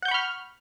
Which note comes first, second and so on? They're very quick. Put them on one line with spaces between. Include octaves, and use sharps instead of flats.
F#5 G6 C#6 B5 F6